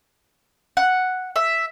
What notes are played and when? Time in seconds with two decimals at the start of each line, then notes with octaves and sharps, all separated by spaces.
0.77 F#5
1.36 E5